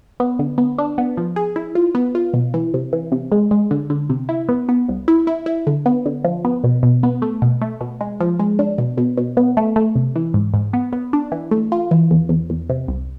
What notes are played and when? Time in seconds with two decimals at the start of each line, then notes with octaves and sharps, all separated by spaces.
0.20 B3
0.39 D3
0.58 B3
0.78 D4
0.98 B3
1.17 F3
1.36 G#4
1.56 E4
1.75 F4
1.95 B3
2.15 F4
2.33 B2
2.54 E3
2.74 C3
2.93 E3
3.12 C3
3.32 G#3
3.51 G#3
3.71 D3
3.90 D3
4.09 C3
4.29 E4
4.49 B3
4.69 B3
4.88 C2
5.08 E4
5.27 E4
5.46 E4
5.67 D3
5.86 B3
6.06 D3
6.24 F3
6.45 B3
6.64 B2
6.83 B2
7.03 B3
7.22 A3
7.42 B2
7.62 A3
7.81 B2
8.01 G#3
8.20 F3
8.40 G#3
8.59 D4
8.78 B2
8.97 B2
9.18 B2
9.37 B3
9.57 A3
9.76 A3
9.95 C3
10.16 E3
10.34 G#2
10.54 G#2
10.73 B3
10.93 B3
11.13 D4
11.32 E3
11.51 A3
11.72 F4
11.91 E3
12.11 E2
12.29 E2
12.50 E2
12.69 C3
12.88 C2